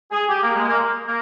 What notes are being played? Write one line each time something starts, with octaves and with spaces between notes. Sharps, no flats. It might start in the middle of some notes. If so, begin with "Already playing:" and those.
G#4
G4
A#3
G#3
A#3
A#3